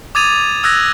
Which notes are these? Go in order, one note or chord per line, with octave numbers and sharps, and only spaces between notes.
D6 D#6 G#6 A6 D#7 F7
D#6 E6 F#6 G#6 A#6